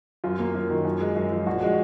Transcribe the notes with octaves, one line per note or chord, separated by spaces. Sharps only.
F#2 F4
A#3
F#2
D#3
F#2
G#3
F#2
F3
A#1 F#4
G#3 F#4